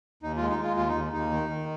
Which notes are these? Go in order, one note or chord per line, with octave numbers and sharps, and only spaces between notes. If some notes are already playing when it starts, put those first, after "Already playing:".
D#2 D#4
G#3 F4
D#4
G#3 F4
D#2 F4
D#4
D#2
D#2 D#4
D#3
D#3